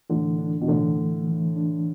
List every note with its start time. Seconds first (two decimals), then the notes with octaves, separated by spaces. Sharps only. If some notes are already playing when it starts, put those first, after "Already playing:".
0.10 A2 D3 E3
0.38 D4
0.61 B2
0.68 A2 D3 E3
0.98 A3
1.28 E3
1.56 D4